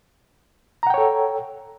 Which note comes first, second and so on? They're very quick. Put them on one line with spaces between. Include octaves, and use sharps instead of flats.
A#5 F#5 G5 C#5 A4